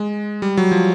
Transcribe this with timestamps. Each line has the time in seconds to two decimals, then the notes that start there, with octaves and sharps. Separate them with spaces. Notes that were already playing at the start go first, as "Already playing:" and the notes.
Already playing: G#3
0.42 G3
0.57 F#3
0.72 F3